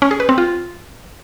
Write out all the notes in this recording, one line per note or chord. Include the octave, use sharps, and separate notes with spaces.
C#4
G#4
B4
C4
F4